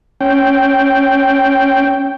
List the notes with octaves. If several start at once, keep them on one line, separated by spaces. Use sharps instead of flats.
C#4 G5